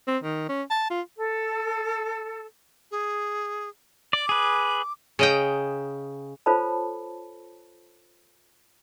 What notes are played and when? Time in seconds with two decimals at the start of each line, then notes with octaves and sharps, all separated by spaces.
0.07 C4
0.24 D#3
0.49 C#4
0.71 A5
0.90 F4
1.18 A4
2.91 G#4
4.13 D5 D6
4.29 G#4 B4
5.19 C#3 D#5 G5
6.46 F4 A4 C5 C#5 A5 B5